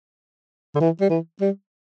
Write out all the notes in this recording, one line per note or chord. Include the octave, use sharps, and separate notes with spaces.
D3
E3
G3
E3
G3